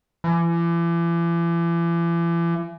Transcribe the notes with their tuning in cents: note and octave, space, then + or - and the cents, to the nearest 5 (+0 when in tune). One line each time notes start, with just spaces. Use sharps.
E3 +40